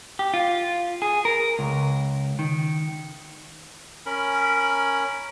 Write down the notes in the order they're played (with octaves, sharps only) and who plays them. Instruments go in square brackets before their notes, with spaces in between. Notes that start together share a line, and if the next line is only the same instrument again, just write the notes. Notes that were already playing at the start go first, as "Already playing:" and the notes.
[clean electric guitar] G4
F4
G#4
A#4
C#2
D#3
[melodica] C#4 A#4 B5